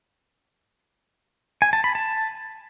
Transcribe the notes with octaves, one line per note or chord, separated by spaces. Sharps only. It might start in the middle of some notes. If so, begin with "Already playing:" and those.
G#5
A5
B5
A5